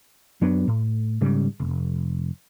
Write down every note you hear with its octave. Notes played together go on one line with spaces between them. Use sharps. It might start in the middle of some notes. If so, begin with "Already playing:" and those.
F#2 F#3 B3 D4
A2
G#2 C#3 G3
F1